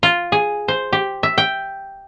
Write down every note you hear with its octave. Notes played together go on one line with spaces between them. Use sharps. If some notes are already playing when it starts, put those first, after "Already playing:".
F4
G#4
C5
G4
E5
G5